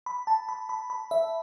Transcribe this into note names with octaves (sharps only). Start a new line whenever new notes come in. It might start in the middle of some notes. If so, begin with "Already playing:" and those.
B5
A5
B5
B5
B5
E5